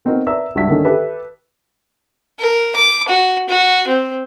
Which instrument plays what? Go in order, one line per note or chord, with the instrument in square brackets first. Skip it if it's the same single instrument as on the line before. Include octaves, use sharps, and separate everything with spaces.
[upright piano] B3 C4 D#4 F#4 A#4
A#4 B4 D5 E5 A#5 E6
C#2 G2 F#4 E5 B6
D3 D#3 A#3 C#4
G4 A4 B4 E5
[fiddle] A#4
D6
F#4
F#4
C4